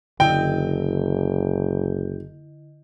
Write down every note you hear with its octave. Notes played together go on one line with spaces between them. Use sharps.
F#1 D3 E4 D#5 G5